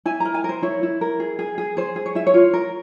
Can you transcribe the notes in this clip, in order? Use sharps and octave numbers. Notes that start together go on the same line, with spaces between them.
E4 G#5
A#5
A#4
G#5
A#4 C5
E4 C#5
E4
A#4
G#4
G#4
G#4
G#4 C5
G#4
C#5
E4 E5
C#5
F4
A#4